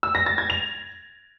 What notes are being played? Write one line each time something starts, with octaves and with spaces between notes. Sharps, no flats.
E6
A#6
A6
G#6
F7